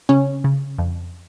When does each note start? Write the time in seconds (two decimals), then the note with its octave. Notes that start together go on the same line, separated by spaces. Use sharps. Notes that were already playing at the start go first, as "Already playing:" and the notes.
0.09 C#3 C#4
0.44 C#3
0.78 F2